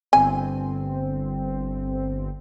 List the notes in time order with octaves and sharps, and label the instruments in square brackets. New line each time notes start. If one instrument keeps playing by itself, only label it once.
[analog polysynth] G1 C4 [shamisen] G#5